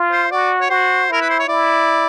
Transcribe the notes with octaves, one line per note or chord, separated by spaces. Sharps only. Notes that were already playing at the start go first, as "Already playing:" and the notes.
Already playing: F4
C5
F#4 D5
C#5
F#4 C5
E4 A#4
B4
C5
C#5
E4 D5